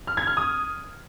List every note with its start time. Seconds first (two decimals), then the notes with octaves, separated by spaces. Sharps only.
0.07 F6
0.17 G#6
0.27 F6
0.37 D#6